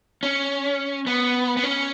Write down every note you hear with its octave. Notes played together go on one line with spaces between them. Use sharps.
C#4
B3
B3
C#4